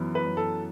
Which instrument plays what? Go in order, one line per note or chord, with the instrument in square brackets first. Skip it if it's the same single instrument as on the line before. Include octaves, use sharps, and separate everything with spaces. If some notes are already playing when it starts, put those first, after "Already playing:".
Already playing: [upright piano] F#2 E3 B3
[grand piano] B4
[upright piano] F#2
[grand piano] A4